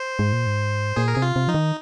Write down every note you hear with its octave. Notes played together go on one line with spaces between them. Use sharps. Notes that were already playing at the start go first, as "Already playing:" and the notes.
Already playing: C5
G#2
A#2
G#2
A#2 G#4
A#4
C3 G#4
F4
C3
F3 D#4
D#3